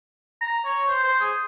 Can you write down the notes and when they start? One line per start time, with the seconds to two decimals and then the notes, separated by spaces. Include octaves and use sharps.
0.41 A#5
0.65 C#5
0.88 C5
1.04 C5
1.20 G#4